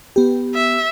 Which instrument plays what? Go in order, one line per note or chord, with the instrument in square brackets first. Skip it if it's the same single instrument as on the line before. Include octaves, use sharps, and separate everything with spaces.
[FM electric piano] B3 G4
[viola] E5